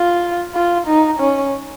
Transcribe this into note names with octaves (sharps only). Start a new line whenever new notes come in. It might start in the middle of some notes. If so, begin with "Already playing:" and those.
Already playing: F4
F4
D#4
C#4